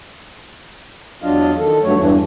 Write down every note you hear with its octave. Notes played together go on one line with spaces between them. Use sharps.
E2 F#3 D4 F4 D#5 F5
D#3 A4
G2 F#3 A3 C#5
E2 G2 E3